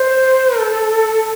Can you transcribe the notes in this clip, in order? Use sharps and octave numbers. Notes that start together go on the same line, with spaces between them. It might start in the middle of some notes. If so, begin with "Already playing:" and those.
Already playing: C5
A4